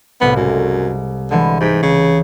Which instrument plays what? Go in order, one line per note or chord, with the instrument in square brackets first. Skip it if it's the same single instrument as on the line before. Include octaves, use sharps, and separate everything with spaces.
[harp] C2 A2 C3 [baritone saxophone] B3
[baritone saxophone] F#2 [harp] G#3
[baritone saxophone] D3 [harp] E3 G#3
[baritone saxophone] G#2 [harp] G4 B6
[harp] C#2 [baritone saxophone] C#3